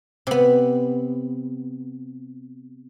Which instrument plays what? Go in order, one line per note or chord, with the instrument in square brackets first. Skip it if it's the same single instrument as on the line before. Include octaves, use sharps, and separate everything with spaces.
[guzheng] C3 B3